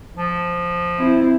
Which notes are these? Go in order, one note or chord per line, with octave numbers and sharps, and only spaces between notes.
F3
C4 E4